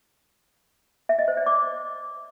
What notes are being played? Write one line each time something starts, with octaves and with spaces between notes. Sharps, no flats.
E5
D#5
C5
D5
D6